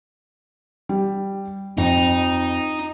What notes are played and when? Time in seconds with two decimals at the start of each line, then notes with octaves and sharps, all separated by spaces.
0.89 G3
1.78 F2 D#4